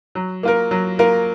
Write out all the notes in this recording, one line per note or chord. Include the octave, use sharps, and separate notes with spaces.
F#3
A#3 F4 A#4
F#3
A#3 F4 A#4